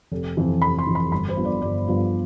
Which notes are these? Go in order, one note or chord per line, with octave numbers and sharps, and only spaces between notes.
F1
F2 E3
F1 B5
C6
F2 E3
B5
G1 B5
C5
G2 F3 B3
D5
G1 D5
G2 F3 B3